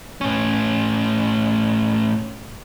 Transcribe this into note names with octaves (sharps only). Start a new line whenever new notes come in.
A2 C#4